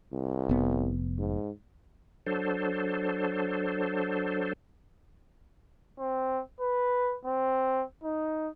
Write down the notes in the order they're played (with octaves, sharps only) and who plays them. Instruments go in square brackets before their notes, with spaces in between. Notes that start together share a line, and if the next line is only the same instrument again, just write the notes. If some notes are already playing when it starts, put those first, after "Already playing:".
[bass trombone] C2
[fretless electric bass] F1 B3
[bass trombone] G#2
[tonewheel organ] F#3 D4 A4 C5
[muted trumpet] C4
B4
C4
D#4